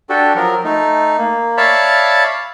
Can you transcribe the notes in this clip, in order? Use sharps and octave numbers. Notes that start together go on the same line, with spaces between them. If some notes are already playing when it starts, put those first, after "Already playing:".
D4 F#4 G4 A4
F3 F#3 A#4
A3 D#4
A#3
C#5 D5 E5 F5 A5 B5